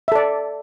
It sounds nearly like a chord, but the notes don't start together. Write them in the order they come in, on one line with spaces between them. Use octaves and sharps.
E5 A4 D5